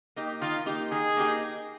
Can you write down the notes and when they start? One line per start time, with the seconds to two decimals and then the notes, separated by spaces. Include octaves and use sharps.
0.16 A#3 D#4 G4
0.42 D#3 F4
0.66 A#3 D#4 G4
0.91 D#3 G#4
1.17 A#3 D#4 G4